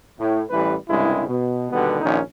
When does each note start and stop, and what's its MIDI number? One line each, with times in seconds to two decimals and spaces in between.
0.20 0.42 45
0.50 0.74 33
0.50 0.74 52
0.50 0.74 55
0.50 0.74 71
0.89 1.24 36
0.89 1.24 43
0.89 1.24 49
0.89 1.24 56
0.89 1.24 64
1.28 1.68 47
1.71 1.98 39
1.71 1.98 47
1.71 1.98 50
1.71 1.98 55
1.71 1.98 59
2.01 2.20 34
2.01 2.20 51
2.01 2.20 61
2.01 2.20 63